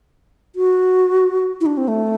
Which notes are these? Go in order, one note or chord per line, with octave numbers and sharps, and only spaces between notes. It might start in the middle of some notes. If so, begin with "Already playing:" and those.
F#4
E4
D4
C4
A3